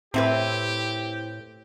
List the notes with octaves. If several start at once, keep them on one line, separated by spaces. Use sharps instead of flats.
A2 C4 E4 G4 B4